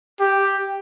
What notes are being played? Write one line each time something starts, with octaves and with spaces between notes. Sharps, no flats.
G4